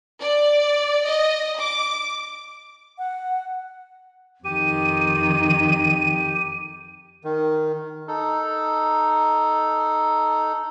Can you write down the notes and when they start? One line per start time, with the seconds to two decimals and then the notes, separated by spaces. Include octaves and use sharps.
0.21 D5
1.06 D#5
1.58 D6
2.98 F#5
4.45 F2 D#3 G4 D#7
7.24 D#3
8.08 D#4 A4